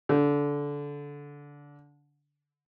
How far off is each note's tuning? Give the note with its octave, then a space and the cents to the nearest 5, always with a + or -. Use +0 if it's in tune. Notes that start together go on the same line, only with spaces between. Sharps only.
D3 -20